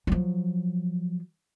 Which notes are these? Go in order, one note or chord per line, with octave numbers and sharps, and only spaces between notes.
F3 F#3